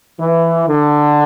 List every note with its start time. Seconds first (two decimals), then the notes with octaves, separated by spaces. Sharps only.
0.20 E3
0.68 D3